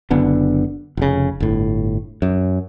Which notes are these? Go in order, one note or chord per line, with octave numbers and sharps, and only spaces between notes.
F#1 D3 B3 D4
F1 C#3
G1 A2
F#2